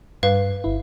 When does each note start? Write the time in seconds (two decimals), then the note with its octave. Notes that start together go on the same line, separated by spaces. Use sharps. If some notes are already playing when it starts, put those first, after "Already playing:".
0.23 G2 B4 F5
0.64 G1 E4